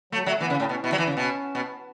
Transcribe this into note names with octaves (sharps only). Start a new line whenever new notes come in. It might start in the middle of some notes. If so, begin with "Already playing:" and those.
F#3 A3
F#3 A3
E3 B3
C#3
A2 C#4
B2 C#4
B2 E4
F#3
E3 E4
C#3
B2 C#4
B2